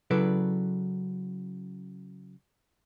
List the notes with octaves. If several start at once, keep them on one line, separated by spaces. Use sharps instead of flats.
C#3 F#3 E4 A4 B4 D5